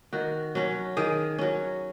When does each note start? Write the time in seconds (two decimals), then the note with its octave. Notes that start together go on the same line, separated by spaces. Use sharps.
0.13 D#3 F#4
0.55 F#3 C#4
0.97 D#3 G#4
1.38 F#3 C#4